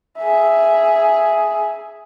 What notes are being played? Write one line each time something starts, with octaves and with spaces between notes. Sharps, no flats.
G#4 E5